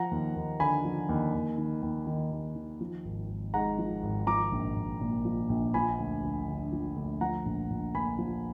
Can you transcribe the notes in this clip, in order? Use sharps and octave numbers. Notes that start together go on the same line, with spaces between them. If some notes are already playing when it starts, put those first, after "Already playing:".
Already playing: F3 F#5 A#5
D#2
D#2
D3 G#5 B5
F3
D#2
D#2
D#3
D#2
D#3
D#2
D#3
F3
G#1
G#1
G#2 F#5 A#5
F3
G#1
F3 A#5 D6
A#1
A#1
A#2
F3
A#1
F3 G#5 B5
D2
D2
D3
F3
D2
F3 F#5 A#5
A#1
A#1
A#2 G#5 B5
F3